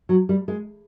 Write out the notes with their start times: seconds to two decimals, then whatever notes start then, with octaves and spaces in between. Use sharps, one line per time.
0.09 F#3
0.29 G3
0.48 G#3